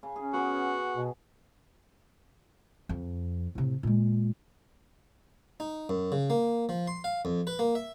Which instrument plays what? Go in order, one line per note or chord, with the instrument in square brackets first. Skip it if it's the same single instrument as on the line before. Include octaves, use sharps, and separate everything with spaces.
[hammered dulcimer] C#3
[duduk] C#4 [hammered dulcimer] G#4
[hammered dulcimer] B3 G#4 D6 [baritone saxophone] F#4
[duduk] B2
[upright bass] F2
A2 C3
A#2 G#3
[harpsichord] D#4
F#2
C#3
A#3
F3
C6
F5
F2
B4
A#3
E5